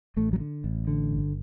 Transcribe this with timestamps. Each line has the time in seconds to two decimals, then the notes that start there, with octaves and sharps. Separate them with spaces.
0.16 A1 A3
0.33 F#3
0.40 D3
0.64 A1
0.87 D3
1.12 G1